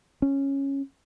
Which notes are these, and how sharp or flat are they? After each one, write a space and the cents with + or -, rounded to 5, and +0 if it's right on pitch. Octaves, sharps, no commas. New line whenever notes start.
C#4 -10